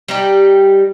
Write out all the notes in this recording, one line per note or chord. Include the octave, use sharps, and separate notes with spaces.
G3 D#4 G4